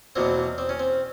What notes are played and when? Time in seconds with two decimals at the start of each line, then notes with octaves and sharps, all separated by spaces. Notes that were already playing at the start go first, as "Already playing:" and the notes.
0.16 E2 B2 F#3 A#3 C4
0.58 C4
0.69 C#4
0.79 C4